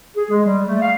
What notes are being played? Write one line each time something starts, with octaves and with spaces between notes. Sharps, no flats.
G#4
G#3
G3
A3
F5